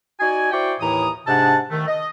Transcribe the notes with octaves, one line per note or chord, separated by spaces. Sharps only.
D#4 F#4 D5 G#5
E4 F#4 C5 D5 G5 C#6
D#2 A2 E3 A#5 D#6
G#2 C3 D4 F#5 A5
D#3 A3
D#5